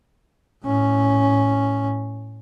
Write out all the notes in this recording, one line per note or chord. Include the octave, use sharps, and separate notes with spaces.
A2 C#4